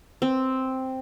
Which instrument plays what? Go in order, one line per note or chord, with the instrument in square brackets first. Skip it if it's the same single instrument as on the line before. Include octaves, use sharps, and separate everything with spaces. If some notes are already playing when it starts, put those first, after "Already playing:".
[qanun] C4